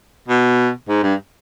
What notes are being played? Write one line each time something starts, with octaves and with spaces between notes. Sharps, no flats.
B2
G#2
G2